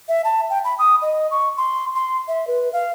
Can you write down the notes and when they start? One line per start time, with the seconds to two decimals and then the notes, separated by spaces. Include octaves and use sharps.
0.09 E5
0.25 A5
0.50 G5
0.64 B5
0.79 D#6
1.02 D#5
1.31 C#6
1.57 C6
1.95 C6
2.28 E5
2.48 B4
2.73 F5